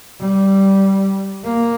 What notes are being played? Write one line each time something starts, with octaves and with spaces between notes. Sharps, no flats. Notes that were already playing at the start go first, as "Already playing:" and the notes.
G3
A#3